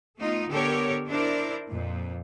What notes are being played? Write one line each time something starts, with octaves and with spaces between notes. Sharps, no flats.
A3 B3 D#4 F4
D3 B3 G4 A4 A#4 C#5
D4 E4 A#4 C5 D5
F2 A#2